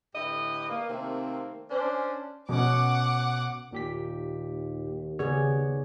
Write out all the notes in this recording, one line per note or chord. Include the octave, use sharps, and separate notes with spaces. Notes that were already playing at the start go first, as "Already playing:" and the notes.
A2 D3 E4 G4 B4 D#5
A#3
C3 D#3 A3 A#3 C4
C#4 D4 C5
B2 C#4 F#5 D6
D#2 A#2 G4 B6
C#3 B3 G#4 C#5 D5